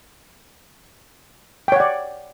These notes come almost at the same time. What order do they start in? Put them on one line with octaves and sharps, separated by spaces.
G5 C#5 F#5 D5